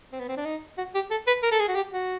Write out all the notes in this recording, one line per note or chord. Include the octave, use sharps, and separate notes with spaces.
C4
B3
C4
D4
D#4
F#4
G4
A4
B4
A#4
A4
G#4
F#4
G4
F#4